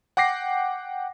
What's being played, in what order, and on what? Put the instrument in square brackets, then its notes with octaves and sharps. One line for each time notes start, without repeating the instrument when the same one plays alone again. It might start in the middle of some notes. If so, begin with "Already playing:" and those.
[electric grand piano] F#5 G5 D6 A#6 C7